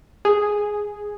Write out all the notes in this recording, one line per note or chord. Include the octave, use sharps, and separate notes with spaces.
G#4